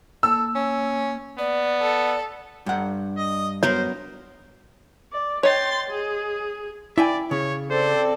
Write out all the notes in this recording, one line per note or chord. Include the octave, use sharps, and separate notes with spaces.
A#3 A4 E6
C#4
B3 D5
A4
G2 F#5
D#5
F#3 B3 A#4 C5 C#5
D5
C#5 D#5 G5 C6 A6
G#4
E4 D5 E5 G5 G#5
C#3 C#5
C4 A4 C5 D5